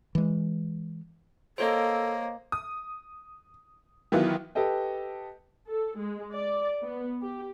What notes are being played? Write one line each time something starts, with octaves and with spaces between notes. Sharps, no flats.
E3 G#3
A#3 A4 C5 C#5 D#5
D#6
D#3 E3 F#3 B3 F4
G4 A4 B4 D#5 G5
A4
G#3
D5
B3
G4